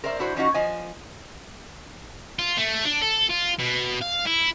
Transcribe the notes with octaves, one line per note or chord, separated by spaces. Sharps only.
A#4 C5 D5 E5
D4 E4 F#4 C5
F3 C#4 D#4 F#4
F3 D#5 G#5
F4
A3
D4
A4
F4
B2
F5
E4